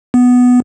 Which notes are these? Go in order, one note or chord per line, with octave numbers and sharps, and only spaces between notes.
B3